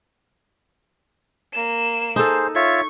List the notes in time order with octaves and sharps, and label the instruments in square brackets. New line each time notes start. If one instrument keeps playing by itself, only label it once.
[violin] A#3 E7
[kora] D#4 A4 [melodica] G#4 C5
[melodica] F4 C#5 E5 [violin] C#6